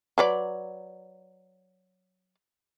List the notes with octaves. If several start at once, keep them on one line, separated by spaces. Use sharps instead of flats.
F#3 B4 D5